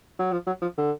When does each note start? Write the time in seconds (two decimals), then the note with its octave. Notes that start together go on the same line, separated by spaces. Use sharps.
0.19 F#3
0.32 F3
0.47 F#3
0.62 F3
0.78 D3